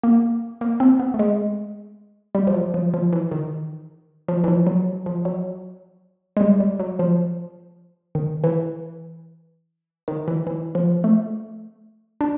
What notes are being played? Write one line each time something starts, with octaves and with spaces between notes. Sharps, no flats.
A#3
A#3
C4
B3
A3
G#3
G3
F3
F#3
F3
F3
E3
D#3
F3
E3
F3
F#3
F3
F#3
G#3
G3
G3
F#3
F3
D#3
E3
D#3
E3
E3
F3
A3
D4